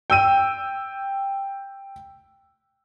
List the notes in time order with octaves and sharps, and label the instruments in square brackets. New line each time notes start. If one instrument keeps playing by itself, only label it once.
[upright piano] G5 E6 D#7